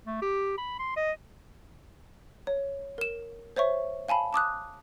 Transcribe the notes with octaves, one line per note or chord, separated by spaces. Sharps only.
A3
G4
B5
C6
D#5
C#5
A#4 E7
C5 C#5 E5 C#6
F5 G#5 A5 B5
A5 D6 D#6 F#6